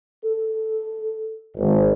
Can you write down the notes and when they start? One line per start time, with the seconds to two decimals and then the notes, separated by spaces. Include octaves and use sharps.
0.24 A4
1.57 G#1